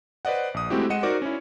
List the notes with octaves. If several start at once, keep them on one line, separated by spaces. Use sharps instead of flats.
B4 C5 D5 D#5 F#5
A#1 D#6
G#3 A3 C4 E4 F#4 G4
G#3 D#5 F#5 C#7 D#7 E7
D#4 F#4 A#4 C5 D5 D6
C#4 E4